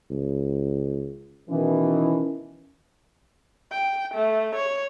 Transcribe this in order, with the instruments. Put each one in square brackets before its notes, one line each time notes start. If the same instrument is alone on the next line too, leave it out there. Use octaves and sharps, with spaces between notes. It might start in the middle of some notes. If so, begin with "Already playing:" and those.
[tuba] C#2
[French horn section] B2 D#3 E3 [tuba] C#4
[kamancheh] G5
A3
C#5